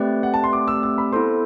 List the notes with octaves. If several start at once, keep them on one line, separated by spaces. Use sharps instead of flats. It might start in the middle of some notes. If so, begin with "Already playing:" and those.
Already playing: A3 C4 G4 B4 D5
F#5
A5
C6
D6
E6
E6
B5
B3 E4 A4 C5 C6